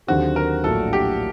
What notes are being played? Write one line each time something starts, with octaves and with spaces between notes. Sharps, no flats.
D#2 D3 F#3 C4 F#4 G4
A#4
A#1 A2 F#3 A#3 D4 A4
G4